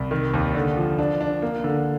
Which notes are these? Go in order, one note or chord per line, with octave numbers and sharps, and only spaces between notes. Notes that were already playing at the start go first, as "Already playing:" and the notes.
Already playing: C2
D#3
D#2
D3
F3
D4
D4
A#3
D3